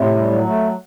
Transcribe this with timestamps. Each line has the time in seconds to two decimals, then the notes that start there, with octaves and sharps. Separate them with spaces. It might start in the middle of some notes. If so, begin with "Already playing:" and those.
Already playing: A2 C3
0.15 G3
0.30 F#3
0.45 A3